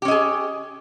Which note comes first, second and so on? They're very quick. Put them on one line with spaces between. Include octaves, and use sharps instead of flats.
G4 C#4 D#5 G#4